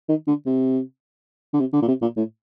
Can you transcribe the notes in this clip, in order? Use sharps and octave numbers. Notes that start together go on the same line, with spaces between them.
D#3
D3
C3
D3
C3
D3
A#2
C3
A#2
A2